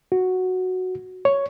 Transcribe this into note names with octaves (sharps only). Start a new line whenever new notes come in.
F#4
C#5